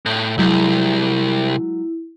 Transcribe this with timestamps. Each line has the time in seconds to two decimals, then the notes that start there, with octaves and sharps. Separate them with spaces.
0.06 A2
0.38 C2 F#3 G#3 A3 E4